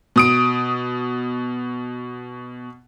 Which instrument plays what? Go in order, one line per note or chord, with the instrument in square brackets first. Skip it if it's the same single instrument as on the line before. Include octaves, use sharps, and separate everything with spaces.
[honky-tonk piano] B2 D#6 D7